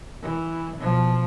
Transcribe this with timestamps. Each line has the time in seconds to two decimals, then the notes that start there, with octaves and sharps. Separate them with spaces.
0.22 E3
0.76 B2 F3